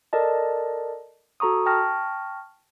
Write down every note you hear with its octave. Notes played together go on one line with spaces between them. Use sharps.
A4 A#4 D5 D#5 A5
F#4 A4 A#5 C#6 D#6
G5 A5 C#6 F6 A#6